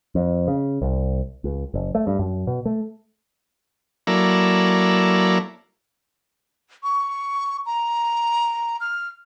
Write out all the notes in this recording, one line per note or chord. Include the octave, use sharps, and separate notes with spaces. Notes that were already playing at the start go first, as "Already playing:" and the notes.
F2
C#3
C2
C#2
F#1
A3
G2
F#2
B2
A3
F#3 A#3 E4 A4 D5 A#5
C#6
A#5
F6